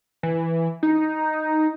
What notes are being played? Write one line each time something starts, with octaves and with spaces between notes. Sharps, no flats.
E3
D#4